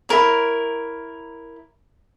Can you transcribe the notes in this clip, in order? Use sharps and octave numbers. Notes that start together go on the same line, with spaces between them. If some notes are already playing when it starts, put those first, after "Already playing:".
E4 G#4 A#4 C#5